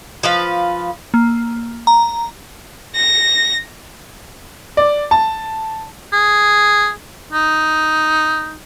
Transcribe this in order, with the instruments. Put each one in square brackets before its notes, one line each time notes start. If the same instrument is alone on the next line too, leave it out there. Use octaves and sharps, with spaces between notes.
[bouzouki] F3 B4 F5
[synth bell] A#3
A#5
[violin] A#6
[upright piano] D5
A5
[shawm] G#4
D#4